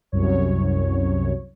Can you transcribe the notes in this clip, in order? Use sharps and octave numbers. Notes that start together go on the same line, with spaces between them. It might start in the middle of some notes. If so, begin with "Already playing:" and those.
C2 F#2 C#5